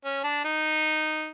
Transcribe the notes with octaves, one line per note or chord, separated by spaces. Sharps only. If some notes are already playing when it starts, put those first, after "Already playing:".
C#4
D4
D#4